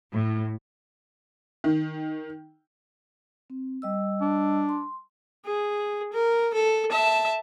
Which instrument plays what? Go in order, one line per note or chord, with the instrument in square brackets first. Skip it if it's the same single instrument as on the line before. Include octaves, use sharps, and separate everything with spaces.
[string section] A2
[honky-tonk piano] D#3
[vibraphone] C4
G3 D#5 E6
[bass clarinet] D4
[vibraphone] C6
[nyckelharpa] G#4
A#4
A4
E5 A5